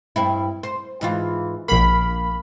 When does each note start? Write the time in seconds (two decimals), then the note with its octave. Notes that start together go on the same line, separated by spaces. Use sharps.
0.16 G2 C4 E4
0.63 C5
1.01 G#2 E3 F4
1.68 A#1 A#3 B5